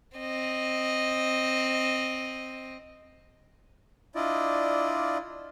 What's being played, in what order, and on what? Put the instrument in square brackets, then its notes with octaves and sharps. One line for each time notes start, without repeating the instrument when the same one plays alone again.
[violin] C4 D#5
[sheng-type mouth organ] D4 E4 F4 D5 D#5